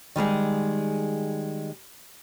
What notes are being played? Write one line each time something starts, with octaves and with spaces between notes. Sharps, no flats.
D#3 G3 G#3 G#4